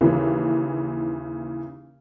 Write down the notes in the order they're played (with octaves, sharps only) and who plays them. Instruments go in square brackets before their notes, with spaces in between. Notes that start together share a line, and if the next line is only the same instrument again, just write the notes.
[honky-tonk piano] D#2 C#3 E3